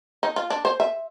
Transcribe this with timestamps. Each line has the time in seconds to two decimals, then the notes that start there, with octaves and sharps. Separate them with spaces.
0.23 D#4
0.36 F4
0.50 D4
0.65 C5
0.80 E5